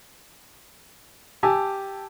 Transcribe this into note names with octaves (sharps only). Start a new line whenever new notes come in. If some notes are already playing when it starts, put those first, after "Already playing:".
G4 G#5 A5 E6